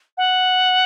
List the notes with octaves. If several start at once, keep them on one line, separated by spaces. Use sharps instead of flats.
F#5